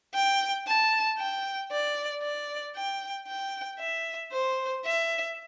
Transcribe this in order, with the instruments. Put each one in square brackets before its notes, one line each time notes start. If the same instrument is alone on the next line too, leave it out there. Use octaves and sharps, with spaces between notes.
[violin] G5
A5
G5
D5
D5
G5
G5
E5
C5
E5